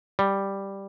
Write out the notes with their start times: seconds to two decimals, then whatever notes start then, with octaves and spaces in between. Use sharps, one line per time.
0.19 G3